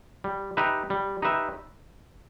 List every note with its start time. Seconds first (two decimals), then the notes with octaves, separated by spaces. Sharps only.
0.24 G3
0.57 D#4 G4 B4 E5
0.90 G3
1.22 D#4 G4 B4 E5